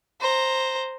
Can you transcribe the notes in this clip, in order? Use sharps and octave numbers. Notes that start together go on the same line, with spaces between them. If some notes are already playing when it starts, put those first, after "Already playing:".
C5 A#5